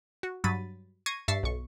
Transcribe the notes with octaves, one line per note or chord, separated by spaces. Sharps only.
F#4
G2 F#3 B5 A6 D#7
C#6 G#6 A#6 C7 D#7
G2 E5 C#6 A6 B6 C7
B1 C#6